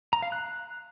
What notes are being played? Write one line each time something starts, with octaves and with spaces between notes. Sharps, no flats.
A#5
F5
F#6